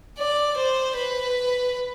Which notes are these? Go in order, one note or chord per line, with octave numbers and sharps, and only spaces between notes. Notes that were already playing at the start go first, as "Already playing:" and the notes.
D5
C5
B4